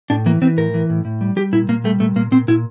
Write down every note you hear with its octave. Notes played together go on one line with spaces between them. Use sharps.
A2 D4
E3 A#3
E3 C4
A2 A#4
E3
A2
A2
G3
G3 G4
A#2 E4
A#2 A#3
G3 A3
A#2 A3
A#2 A#3
A#2 C4
A#2 E4